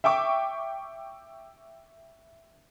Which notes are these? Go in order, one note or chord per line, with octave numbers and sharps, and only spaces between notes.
E5 G5 C#6 D6